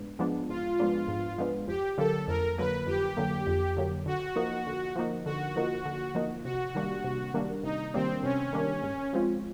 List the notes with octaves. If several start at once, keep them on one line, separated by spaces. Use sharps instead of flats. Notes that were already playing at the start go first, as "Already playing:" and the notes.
Already playing: G#2 B3 D4
F3 G#3 B3 D4
G#2 F4
F3 G#3 B3 D4
G#2
F3 G#3 B3 D4
F2 G4
D3 F#3 A#3 A4
F2 A#4
D3 F#3 A#3 B4
F2 G4
D3 F#3 A#3
F2
D3 F#3 A#3
D3 F#4
F3 A#3 D#4
D3
F3 A#3 D#4
D3 F#4
F3 A#3 D#4
D3
F3 A#3 D#4
C3 F#4
D#3 G3 A#3 D4
C3
D#3 G3 A#3 D4
C3 D#4
D#3 G3 A#3 C4 D4
C3 C#4
D#3 G3 A#3 D4
G#2
F3 G#3 C4 F4